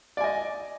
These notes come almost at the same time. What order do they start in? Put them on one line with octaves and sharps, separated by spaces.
D5 G#5 D#5